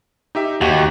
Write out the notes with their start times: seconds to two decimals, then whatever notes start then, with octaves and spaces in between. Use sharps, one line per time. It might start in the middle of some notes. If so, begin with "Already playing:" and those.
0.35 D#4 G4 E5
0.61 D#2 F#4 G4